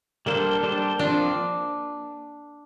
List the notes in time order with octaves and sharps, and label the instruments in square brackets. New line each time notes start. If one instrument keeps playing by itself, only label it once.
[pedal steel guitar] G3 D4 A4 C5 [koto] A#3
[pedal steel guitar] G3 D4 A4 C5
[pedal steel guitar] F3 C4 F4 [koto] D4